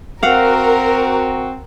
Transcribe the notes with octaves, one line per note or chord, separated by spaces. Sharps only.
C4 F#4 A#4 F5 F#5